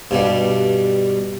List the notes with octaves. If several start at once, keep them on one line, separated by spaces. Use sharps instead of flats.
G2 B2 G3